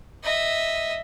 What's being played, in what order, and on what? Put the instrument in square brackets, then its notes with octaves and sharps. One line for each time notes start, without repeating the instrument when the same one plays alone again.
[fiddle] D#5 E5